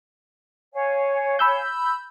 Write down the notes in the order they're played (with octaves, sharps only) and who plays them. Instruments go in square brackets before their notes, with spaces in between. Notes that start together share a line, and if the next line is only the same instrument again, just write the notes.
[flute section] C#5 F5 G#5
[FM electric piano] B5 E6 G6